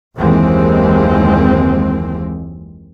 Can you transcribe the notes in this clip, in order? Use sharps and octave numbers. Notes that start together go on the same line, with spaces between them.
F#1 D#2 E3 G#3 C4